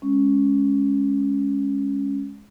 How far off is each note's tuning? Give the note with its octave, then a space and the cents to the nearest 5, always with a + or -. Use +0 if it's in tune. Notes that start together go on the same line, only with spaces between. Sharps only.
G#3 +0 C#4 +0